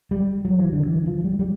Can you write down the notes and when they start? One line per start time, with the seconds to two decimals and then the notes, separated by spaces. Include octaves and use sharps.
0.11 G3
0.45 F#3
0.59 E3
0.72 D3
0.87 E3
1.06 F3
1.24 G3
1.39 G3